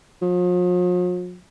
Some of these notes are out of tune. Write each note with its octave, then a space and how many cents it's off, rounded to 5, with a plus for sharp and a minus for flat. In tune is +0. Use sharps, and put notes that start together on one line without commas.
F3 +45